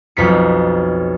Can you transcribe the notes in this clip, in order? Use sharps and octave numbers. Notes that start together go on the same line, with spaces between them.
B1 F2 B6 C#7